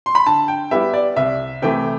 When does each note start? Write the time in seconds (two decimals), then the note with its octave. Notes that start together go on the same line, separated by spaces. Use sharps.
0.06 C6
0.15 B5
0.26 D3 A5
0.48 G5
0.71 G3 B3 E4 G4 E5
0.94 D5
1.16 C2 E5
1.62 C3 E3 A3 G5